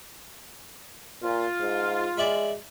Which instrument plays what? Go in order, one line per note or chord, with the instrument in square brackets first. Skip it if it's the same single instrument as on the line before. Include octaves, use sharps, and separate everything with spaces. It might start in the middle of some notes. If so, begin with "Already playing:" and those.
[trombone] A#2 [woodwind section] F4
[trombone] G#2
[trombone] G#3 [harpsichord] D5 E5 B5